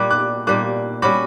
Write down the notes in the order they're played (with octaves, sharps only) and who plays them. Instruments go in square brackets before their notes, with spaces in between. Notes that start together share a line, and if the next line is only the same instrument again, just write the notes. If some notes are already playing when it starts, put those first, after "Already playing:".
Already playing: [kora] A#2 G3 A#3 [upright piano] D6 F#6
[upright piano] D6 F#6
[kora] A#2 G3 A#3 [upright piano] D6 F#6
[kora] G3 C#4 F#4 [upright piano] B5 D6